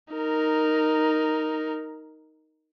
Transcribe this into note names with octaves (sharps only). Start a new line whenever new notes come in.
D#4 A#4